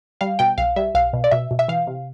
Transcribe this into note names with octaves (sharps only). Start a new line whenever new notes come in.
G3 F5
B2 G5
B1 F5
G3 E5
B1 F5
B2
D5
B2 E5
B2
E5
E3 F5
C3